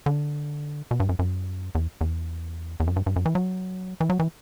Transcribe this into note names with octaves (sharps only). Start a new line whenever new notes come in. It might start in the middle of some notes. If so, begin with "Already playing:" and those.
D3
B2
G2
F#2
F#2
E2
E2
E2
F#2
G2
G2
F#2
E3
F#3
E3
F#3
E3